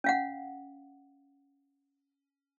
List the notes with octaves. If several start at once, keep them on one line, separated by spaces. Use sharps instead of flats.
C#4 F5 F#5